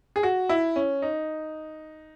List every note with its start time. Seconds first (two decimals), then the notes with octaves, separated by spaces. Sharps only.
0.16 G#4
0.23 F#4
0.49 E4
0.76 C#4
1.02 D#4